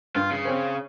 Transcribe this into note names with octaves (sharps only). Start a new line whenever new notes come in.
G2 F4
C#3
C4 C#4 C5